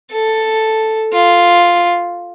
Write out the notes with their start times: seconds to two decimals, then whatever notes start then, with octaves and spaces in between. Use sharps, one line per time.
0.11 A4
1.13 F4